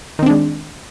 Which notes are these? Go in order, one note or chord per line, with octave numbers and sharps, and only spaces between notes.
D#3 G#3 C4 D4